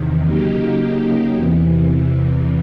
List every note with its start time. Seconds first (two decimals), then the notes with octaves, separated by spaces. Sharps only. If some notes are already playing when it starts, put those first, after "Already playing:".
Already playing: E2 C3 D#3
0.24 C#3 F#3 A#3 D#4 G4
1.33 E2 C3 E3